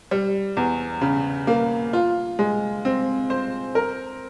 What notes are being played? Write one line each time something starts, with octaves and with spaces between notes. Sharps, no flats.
G3
E2
C#3
A#3
F4
G#3
C4
C5
A#4